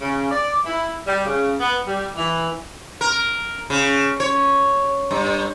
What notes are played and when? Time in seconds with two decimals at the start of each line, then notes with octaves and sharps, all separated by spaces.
0.01 C#3
0.31 D5
0.66 E4
1.07 G3
1.26 C#3
1.60 B3
1.86 G3
2.16 E3
3.01 A#4
3.70 C#3
4.20 C#5
5.11 G2